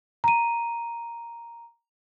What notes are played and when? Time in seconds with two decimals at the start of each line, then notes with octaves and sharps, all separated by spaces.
0.24 A#5 D#7